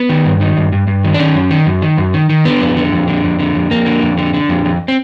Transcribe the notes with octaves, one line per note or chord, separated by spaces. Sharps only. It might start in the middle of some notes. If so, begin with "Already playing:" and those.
Already playing: B3
D#3
G2
D#3
G2
G2
G2
D#3
D4
D#3 C#4
F#2
D#3
F#2
D#3
F#2
D#3
D#3
D3 B3
F2
D3
F2
D3
F2
D3
F2
F2 A#3
D3
F2
D3
D3
F2
F2
C4